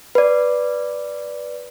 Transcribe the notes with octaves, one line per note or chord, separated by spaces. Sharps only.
B4 D5